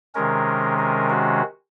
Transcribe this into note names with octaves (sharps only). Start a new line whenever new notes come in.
C3 D#3 G#3 C#4 A#4
A#4
F#4